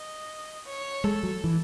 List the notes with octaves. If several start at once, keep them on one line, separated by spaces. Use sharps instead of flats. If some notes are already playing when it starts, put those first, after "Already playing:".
Already playing: D#5
C#5
G#3 A4
F#3
E3